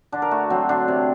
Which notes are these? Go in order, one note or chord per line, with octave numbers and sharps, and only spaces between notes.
D3 D4
A#4
A3 F#4
F#3 C4
D3 D4
C3